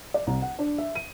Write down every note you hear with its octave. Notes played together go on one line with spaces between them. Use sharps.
D5
C2
F#5
D4
E5
D#7